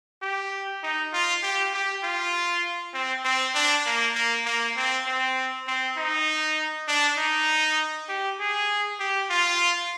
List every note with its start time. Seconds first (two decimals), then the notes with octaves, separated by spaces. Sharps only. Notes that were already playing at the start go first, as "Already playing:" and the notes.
0.22 G4
0.83 D#4
1.13 F4
1.43 G4
1.74 G4
2.03 F4
2.94 C4
3.24 C4
3.55 D4
3.86 A#3
4.15 A#3
4.45 A#3
4.77 C4
5.07 C4
5.67 C4
5.97 D#4
6.88 D4
7.18 D#4
8.09 G4
8.40 G#4
9.00 G4
9.30 F4